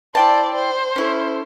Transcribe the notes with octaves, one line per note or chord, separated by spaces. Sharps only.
E4 C5 D5 G5 A5
C5
C#4 E4 A4